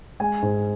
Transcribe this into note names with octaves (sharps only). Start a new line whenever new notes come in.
G#3 G#5
G#2